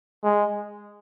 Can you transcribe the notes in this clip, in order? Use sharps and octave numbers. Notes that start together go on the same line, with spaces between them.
G#3